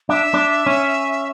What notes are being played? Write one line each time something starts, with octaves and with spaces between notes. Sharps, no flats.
D4 E5
D4
C#4